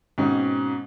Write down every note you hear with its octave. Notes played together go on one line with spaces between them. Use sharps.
G#2 B2 C4 C#4